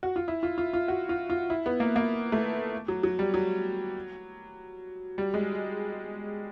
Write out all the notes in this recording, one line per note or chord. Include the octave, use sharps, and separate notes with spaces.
F#4
F4
E4
F4
F4
F4
F#4
F4
F4
E4
B3
A#3
A#3
A3
F#3
F#3
G3
F#3
G3
G#3